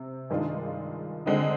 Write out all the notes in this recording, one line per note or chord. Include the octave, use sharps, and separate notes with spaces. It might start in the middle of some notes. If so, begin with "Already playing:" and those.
Already playing: C3 C4
G2 D#3 G#3 D4 F4
D3 G#3 C4 D#4